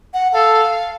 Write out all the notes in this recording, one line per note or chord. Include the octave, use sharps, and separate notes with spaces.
F#5
A4 F5